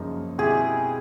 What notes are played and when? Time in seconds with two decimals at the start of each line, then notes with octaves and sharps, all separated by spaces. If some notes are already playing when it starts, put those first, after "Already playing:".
Already playing: F#2 C#3 F3 A#3 D#4
0.38 B2 G#3 C4 E4 G4 G#4